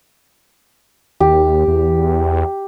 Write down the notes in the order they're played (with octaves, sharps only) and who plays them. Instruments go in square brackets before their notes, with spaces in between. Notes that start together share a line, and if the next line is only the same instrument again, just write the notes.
[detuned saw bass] D#2 [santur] G4
[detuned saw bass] E2